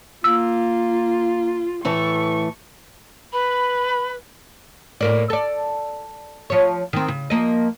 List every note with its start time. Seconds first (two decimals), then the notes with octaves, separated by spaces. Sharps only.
0.24 A#3 F4 E6
1.85 A2 E3 A3 A4 C#6
3.33 B4 B5
5.01 A2 A#3 D5
5.30 A4 D5
6.50 F3 C#5
6.93 D#3 C4
7.08 C#3
7.30 F3 A#3 D#5